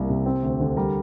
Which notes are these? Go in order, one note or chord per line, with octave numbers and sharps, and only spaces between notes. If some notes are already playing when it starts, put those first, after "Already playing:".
Already playing: C2 A#3 A#4
C3
C4
D2
D3
G3 A#4